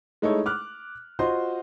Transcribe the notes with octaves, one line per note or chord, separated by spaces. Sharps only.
G#3 A3 D#4 E4 A4 C#5
D6 F6 F#6
F4 F#4 C5 D#5 C6